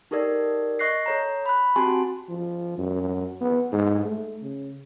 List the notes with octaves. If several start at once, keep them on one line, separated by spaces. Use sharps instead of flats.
D#4 G4 A4 A#4 D5
D#5 C#6 F#6 A#6 C7
A4 C#5 A#5
B5 F#6
C4 F#4 G4 G#5 A5 C6
F3
F#2
B3
G#2
A3
C#3